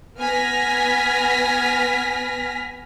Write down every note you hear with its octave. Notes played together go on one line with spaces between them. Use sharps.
B3 G#5 F6 A#6 B6